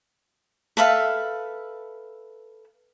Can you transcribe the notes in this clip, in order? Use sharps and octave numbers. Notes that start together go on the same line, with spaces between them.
A4 B4 E5 F5